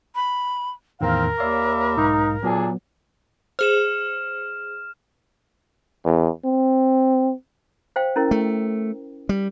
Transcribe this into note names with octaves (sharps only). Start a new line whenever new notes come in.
B5
E2 A2 D#3 C4 A#4 F5
D#2 C#5 D5 E5 F5 B5 D6
B1 G#2 D#4 F5
A#2 F#3 B3 D4 G#4 A4
G#4 C5 F6 E7
E2
C4
C5 F5 G5
C#4 E4 A#4
A3
G3